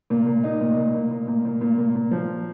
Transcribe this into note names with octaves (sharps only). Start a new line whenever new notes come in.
A#2
A#2
D#4
A#2
A#2
A#2
A#2
A#2
A#2
A#2
A#2
A#2
F3